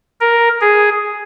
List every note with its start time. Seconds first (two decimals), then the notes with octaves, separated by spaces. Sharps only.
0.21 A#4
0.61 G#4